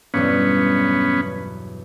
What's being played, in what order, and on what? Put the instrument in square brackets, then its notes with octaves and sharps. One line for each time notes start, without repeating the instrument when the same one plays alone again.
[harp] B1 E2 G2 [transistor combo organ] B3 C#4